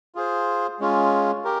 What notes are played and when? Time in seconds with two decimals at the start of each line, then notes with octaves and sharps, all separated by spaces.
0.15 F4 G#4 C5
0.80 G#3 C#4 F4
1.45 G4 A#4